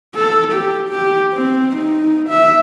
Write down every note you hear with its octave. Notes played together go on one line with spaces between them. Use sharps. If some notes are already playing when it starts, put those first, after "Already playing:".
A4
G4
G4
C4
D#4
E5